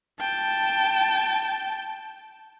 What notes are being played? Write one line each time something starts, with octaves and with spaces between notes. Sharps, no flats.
G5 A5